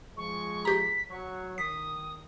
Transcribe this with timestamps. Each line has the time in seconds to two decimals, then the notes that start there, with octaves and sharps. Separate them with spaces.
0.17 F3 G#3 C#6
0.65 G4 A#5 B6
1.10 F#3 C#6
1.58 D#3 D#6 B6